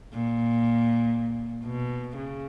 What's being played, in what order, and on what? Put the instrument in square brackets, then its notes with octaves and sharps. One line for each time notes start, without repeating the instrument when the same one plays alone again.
[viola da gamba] A#2
B2
C#3